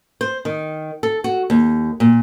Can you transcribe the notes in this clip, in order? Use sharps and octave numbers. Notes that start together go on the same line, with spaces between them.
C5
D#3
A4
F#4
D#2
A#2